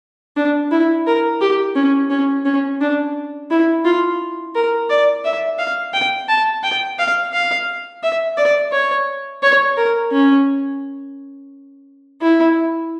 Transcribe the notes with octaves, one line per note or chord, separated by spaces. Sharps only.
D4
E4
A#4
G4
C#4
C#4
C#4
D4
E4
F4
A#4
D5
E5
F5
G5
A5
G5
F5
F5
E5
D5
C#5
C#5
A#4
C#4
E4